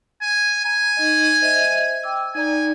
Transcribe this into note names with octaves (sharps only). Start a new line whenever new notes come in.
G#5
G#5 A#5
D#4 D#5
C5 D#5 E5
G5 D6 E6
D#4 D5 G#5 A#5